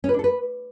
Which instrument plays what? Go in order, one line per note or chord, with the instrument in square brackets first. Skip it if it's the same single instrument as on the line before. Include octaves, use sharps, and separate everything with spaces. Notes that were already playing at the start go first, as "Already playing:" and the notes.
[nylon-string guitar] C#4
B4
D4
A4
B4